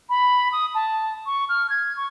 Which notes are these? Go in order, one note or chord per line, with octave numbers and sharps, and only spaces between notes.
B5
D#6
A5
C#6
F6
G#6
C#6